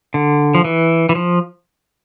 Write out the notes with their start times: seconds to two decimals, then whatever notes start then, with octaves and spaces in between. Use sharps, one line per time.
0.14 D3
0.55 F3
0.64 E3
1.09 E3
1.15 F3